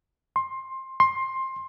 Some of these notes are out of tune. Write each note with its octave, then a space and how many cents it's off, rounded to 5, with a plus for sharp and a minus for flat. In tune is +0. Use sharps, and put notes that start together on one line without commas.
C6 +15
C6 +15